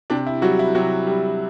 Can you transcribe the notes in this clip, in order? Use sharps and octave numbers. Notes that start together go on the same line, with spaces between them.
C3 D4
E4
F#3 G3 F#4
E4
C3 F#3 F#4
G3